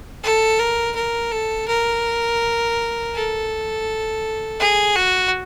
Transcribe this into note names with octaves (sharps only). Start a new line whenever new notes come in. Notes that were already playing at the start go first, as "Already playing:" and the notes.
A4
A#4
A#4
A4
A#4
A4
G#4
F#4